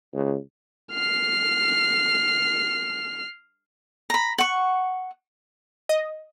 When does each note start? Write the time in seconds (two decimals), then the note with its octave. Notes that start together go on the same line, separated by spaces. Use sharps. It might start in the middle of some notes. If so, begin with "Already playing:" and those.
0.14 C#2
0.93 F6 C7
4.10 A#5 B5
4.38 F#5 C#6
5.89 D#5